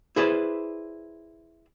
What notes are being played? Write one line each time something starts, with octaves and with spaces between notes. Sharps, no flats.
E4 G#4 B4 C5 D5